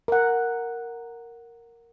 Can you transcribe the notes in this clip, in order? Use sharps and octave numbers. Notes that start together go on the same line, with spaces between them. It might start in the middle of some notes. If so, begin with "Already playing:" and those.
A#4 F#5